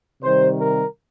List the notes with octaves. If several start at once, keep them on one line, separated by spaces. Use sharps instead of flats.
C3 D#3 G3 C5
A#4